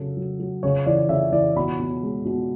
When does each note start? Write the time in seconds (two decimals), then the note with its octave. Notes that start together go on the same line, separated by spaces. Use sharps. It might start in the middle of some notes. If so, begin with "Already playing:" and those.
Already playing: C#3 F#3 A4
0.17 F#3
0.39 F#3
0.63 C#3 C#5
0.86 E3 D5
1.09 C#3 E5
1.32 E3 D5
1.56 B2 B5
1.79 B2
2.03 G#3
2.25 B2